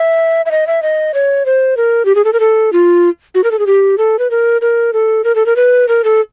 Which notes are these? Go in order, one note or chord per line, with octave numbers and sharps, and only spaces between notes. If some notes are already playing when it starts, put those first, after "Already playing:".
Already playing: E5
E5
D#5
E5
D#5
C#5
C5
A#4
G4
G#4
A4
A#4
A4
F4
F#4
A#4
A4
G#4
G4
A4
B4
A#4
A#4
A4
A#4
A4
A#4
B4
A#4
A4